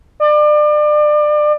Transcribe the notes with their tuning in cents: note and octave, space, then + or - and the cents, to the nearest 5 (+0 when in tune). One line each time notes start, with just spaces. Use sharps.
D5 +30